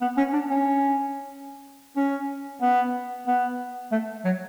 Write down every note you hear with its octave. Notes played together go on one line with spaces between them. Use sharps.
B3
C#4
D4
C#4
C#4
B3
B3
A3
F#3